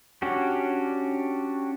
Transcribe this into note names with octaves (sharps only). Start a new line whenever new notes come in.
C#4 D4 F#4 G4